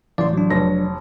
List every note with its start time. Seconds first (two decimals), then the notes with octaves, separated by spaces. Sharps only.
0.18 A1 D5 C6
0.33 F#3 D4
0.50 F1 C#5 A#6